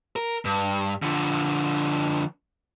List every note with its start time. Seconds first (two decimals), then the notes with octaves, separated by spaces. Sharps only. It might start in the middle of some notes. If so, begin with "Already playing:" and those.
0.16 A#4
0.45 G2
1.02 D3 F3